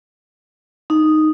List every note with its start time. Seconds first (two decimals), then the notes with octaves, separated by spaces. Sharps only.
0.90 D#4